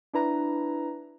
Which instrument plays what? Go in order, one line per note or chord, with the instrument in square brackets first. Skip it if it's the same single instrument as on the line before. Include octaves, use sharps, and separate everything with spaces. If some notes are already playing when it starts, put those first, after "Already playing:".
[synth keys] D4 E4 B4 A#5